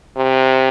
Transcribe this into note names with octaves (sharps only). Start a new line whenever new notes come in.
C3